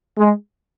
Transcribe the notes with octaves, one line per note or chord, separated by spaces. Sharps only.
G#3